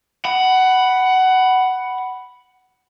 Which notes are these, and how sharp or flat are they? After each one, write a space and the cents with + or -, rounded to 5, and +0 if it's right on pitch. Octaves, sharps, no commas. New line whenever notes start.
F#5 +15 B5 +0